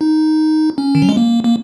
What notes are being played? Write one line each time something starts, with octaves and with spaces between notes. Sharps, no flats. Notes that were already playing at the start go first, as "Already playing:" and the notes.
D#4
C#4
D#3
F#3
G#3
A#3
A#3